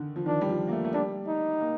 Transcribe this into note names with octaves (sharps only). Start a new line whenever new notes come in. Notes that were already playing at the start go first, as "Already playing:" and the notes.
Already playing: D3 D#3
F3
D#3 D4
G3
F3
A#3
A3
A3
G3 D4
D#4
A#3